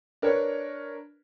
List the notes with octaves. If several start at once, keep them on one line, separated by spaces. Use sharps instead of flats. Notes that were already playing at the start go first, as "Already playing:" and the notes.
D4 A#4 B4 C#5